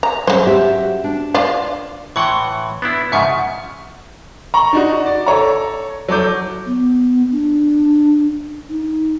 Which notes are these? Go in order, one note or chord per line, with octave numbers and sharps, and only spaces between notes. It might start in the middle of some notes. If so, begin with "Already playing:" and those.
A#5
C#3 F#3 C5
F#4 G4 E5
D4
D4 F4 F5
A2 E3 F#5 C6 C#6
B3 D4 E4
G#2 C#3 F3 E5 F#5 C#6
A#5 C#6
D4 D#4 F#4
D5
A4 C#5 A#5
F#3 A4 D6 G6
B3
D4
D#4